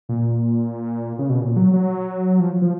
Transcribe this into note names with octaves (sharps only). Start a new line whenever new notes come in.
A#2
C#3
B2
A#2
F#3
F#3
F3
F3